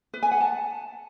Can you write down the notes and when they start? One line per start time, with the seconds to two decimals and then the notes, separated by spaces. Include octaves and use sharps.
0.14 B4
0.23 G#5
0.32 F#5
0.40 A5